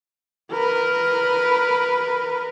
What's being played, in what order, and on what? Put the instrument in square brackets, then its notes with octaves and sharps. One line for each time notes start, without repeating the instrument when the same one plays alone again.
[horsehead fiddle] A#4 B4